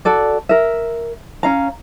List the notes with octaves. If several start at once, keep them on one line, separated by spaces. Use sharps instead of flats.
F#4 A4 D5
A#4 E5
C#4 F5 A#5